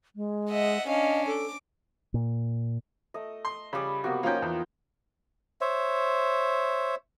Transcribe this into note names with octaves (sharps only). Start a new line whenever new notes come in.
G#3
D#5 E5 F#5
C#4 D4 D#5 F5
A4 D6
A#2
A3 D#5
C6
C#3 G3 B5
C3 A#3 B3 F#4
F3 A#3 C#4 D#4 G5
E2
C5 C#5 E5